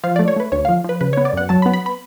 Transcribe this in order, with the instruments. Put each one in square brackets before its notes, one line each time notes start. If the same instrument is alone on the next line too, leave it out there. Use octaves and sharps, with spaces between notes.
[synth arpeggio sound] F3 F5
A3 D5
C#5
A3 B4
D2 C#5
F5
F3
F3 B4
C#3 B4
C#5
B3
D5
F#2 F#5
F#3 A5
B5
B3
B5
B5